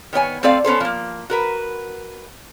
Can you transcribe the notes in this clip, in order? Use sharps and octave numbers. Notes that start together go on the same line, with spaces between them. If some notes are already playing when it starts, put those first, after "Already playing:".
D#3 B3 C#5 G#5
A3 C4 A4 D5 F5
B3 C#4 A4 C5
F3 A#3
F#4 A#4 B4